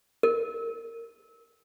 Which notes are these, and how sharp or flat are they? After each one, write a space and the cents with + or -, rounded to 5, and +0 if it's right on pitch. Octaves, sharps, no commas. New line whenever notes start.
A#4 -20